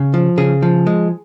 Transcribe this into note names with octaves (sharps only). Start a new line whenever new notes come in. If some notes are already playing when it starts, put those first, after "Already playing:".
Already playing: C#3
F3
C#3 G#4
F3
G#3